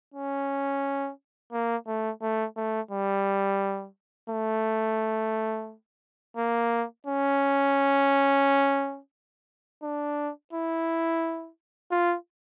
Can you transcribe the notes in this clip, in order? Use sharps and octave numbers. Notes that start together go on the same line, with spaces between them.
C#4
A#3
A3
A3
A3
G3
A3
A#3
C#4
D4
E4
F4